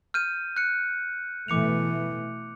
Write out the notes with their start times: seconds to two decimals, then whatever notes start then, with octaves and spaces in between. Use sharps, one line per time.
0.14 F6 G6 D#7
0.57 F#6 C#7
1.48 B2 E3 A3 D6 C#7 F7